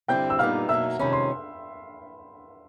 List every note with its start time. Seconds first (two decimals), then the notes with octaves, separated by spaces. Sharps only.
0.08 G2 D3 G3 C4 E4 G5 G6
0.30 E6
0.39 A#2 G3 B3 D#4 F5 F6
0.69 B2 F#3 A#3 D#4 E5 E6
0.99 F2 C3 D#3 G#3 C#4 B5
1.13 C6